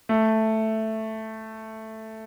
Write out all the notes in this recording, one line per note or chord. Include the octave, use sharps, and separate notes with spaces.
A3